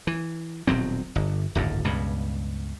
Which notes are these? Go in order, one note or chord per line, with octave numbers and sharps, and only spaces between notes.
E3
D#1 B2 F#3 C4
G1
D1 G#1 F#2
C#2 G2 B2